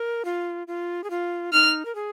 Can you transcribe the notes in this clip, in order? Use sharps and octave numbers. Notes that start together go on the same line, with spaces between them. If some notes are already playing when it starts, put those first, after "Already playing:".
Already playing: A#4
F4
F4
G#4
F4
D#4 F6
A#4
G#4